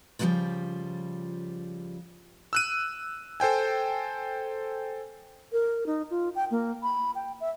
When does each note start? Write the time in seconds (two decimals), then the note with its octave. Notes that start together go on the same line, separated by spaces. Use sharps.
0.19 C#3 F3 G3 G#3 A#3 F4
2.53 E6 F#6 D#7
3.40 A4 C5 G5 G#5
5.52 A#4
5.86 D#4
6.11 F4
6.35 G5
6.51 A#3
6.83 B5
7.15 G5
7.41 E5